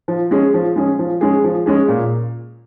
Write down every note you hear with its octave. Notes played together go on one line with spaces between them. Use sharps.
F3
G#3 C#4 G#4
F3
G#3 C#4 G#4
F3
G#3 C#4 G#4
F3
G#3 C#4 G#4
A#2